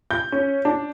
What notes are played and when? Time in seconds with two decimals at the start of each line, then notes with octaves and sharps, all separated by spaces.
0.11 G6
0.32 C#4
0.65 D4